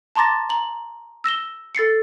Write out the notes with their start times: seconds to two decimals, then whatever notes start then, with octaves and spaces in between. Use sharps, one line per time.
0.16 A5 A#5 C6 D6 A6 A#6
0.49 A#5 F#7
1.24 E6 A#6 E7 G7
1.75 A4 A6 C7 C#7